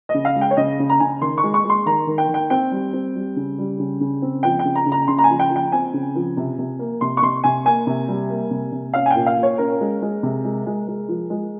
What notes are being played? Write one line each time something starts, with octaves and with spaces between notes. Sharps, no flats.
D#5
C#3
F5
G#3
G5
C#5
C#3 D#5
C#3
A#5
C#3 G#5
D#3 C6
C#6
G#3
C#6
G#3 C6
D#3 A#5
D#3
G5
D#3
G5
C4 G5
G3
C4
G3
C#3
G3
C#3
C#3
C4
F3 G5
G5
C#3
A#5
C#3
A#5
C#3 C6
A#5
G#5
F3
G5
F3
G5
C4 G#5
C#3
F3
C3
C3
A#3
C3 C6
C#6
C3 C6
C3 G#5
A#3 G#5
C3
G3
A#3
C3
C3
C#4 F5
G#5
A#2 G5
F5
A#2
C#5
C#4 A#4
G#3
G#3
C3
G#3
G#3
G#3
F3
G#3